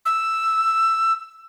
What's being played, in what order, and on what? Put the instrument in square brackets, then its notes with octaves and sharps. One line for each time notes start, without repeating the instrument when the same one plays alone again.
[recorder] E6